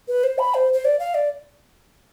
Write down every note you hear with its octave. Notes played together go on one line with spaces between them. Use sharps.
B4
C5
B5
C5
C5
D5
F5
D5